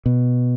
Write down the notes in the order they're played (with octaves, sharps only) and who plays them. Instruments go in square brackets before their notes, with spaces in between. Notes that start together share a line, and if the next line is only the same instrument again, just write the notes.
[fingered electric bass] B2